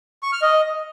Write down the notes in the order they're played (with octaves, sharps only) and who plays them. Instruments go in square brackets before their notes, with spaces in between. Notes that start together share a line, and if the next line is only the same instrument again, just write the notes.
[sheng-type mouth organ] C#6
F6
D#5